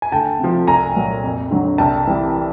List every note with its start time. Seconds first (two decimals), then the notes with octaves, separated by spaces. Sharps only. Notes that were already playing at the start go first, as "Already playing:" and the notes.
0.02 G#5
0.12 D2 G5 A5
0.39 C3 F3
0.67 C2 G#5 A#5
0.96 A#2 F#3
1.24 F2
1.51 D3 F#3
1.78 C2 G5 A5
2.07 C3 E3 G3